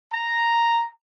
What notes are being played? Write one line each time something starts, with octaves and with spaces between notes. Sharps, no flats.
A#5